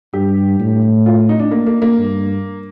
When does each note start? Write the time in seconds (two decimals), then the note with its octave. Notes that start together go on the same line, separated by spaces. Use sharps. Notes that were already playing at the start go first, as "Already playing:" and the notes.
0.13 G2 G4
0.59 A2
1.06 F4
1.29 D#4
1.40 D4
1.51 A#3
1.67 A#3
1.82 A#3
1.98 G2